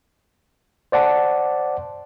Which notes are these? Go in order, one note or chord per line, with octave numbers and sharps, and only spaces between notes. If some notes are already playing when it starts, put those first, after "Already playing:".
C5 D5 F#5 A5